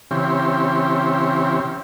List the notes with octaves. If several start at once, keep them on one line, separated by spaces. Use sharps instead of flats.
C#3 E3 C4 G4